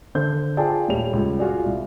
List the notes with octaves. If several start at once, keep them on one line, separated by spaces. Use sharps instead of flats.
D3 C5 G6
F4 G#4 D5 G5 A5
D#1 G3 A3 C#5 F7
C#2
F4 F#4 G#4 D5
C2